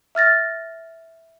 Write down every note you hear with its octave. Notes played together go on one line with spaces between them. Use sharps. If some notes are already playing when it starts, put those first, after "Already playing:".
E5 F6 A6 A#6